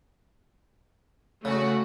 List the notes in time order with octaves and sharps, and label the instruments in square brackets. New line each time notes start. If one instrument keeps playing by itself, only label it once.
[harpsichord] C#3 [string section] A3 F#4